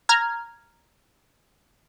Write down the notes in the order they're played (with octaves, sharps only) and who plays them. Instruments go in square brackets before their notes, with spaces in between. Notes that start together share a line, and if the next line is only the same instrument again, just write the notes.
[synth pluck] A#5 F6 G#6